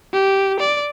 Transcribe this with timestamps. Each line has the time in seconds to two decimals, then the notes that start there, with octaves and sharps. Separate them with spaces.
0.13 G4
0.60 D5